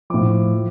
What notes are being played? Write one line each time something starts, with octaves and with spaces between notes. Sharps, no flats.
A2 F3 D6
F3